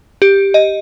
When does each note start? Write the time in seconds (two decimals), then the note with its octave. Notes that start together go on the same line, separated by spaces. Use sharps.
0.22 G4
0.54 D#5